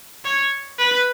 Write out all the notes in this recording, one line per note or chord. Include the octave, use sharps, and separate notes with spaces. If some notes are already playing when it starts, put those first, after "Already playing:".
C#5
B4